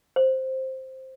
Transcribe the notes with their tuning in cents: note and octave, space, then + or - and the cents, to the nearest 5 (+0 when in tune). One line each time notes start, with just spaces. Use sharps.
C5 +5